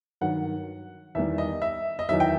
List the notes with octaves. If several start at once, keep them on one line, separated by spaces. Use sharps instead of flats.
G2 D#3 F#3 F#5
E2 D#3 G3 E5
D#5
E5
D#5
E2 D#3 F#3 E5
G5